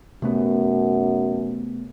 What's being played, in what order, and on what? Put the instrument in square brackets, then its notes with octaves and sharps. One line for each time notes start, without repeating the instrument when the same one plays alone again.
[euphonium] F#2 [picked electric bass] C3 A3 B3